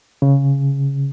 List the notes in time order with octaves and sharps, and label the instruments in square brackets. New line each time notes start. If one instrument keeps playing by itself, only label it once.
[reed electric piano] C#3